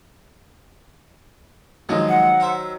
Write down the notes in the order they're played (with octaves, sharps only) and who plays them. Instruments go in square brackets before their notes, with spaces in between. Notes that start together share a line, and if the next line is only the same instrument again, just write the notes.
[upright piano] D#3 F#3 D#4 [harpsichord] F3 G#3 A#3
[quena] F#5
[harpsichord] A#4 C5 E5